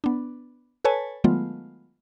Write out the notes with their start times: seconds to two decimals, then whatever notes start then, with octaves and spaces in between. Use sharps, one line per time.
0.04 B3 D4
0.85 A4 B4 C#5 G#5 A5
1.24 D#3 F#3 G#3 A3 B3 F4